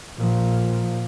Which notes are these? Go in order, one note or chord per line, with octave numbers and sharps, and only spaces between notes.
A#2 F3